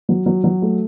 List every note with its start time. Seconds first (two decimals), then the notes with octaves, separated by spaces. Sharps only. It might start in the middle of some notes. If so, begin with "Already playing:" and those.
0.09 F#3
0.26 F#3
0.44 F#3
0.62 A3